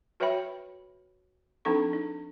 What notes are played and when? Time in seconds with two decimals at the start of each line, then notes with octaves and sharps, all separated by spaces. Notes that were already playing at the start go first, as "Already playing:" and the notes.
0.20 F#4 B4 C#5 E5 G5 B5
1.65 F3 C4 D4 D#4 A4 C#6
1.93 D#4